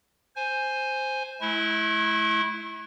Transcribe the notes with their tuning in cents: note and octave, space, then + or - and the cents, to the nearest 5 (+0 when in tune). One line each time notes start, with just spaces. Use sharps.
C5 +0 G#5 +0
A3 -45 E4 +0 C#6 -40